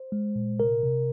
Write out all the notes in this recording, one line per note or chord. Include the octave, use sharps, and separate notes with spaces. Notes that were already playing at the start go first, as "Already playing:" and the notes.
Already playing: C5
G#3
A#2
C3 A#4
C3